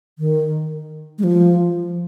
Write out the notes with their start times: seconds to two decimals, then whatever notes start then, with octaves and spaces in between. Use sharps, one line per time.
0.19 D#3
1.19 G#3
1.24 F3